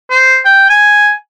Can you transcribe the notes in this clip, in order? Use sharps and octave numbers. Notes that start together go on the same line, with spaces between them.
C5
G5
G#5